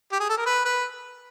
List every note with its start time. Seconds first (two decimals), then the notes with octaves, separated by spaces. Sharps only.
0.12 G4
0.20 G#4
0.29 A4
0.37 A#4
0.46 B4
0.65 B4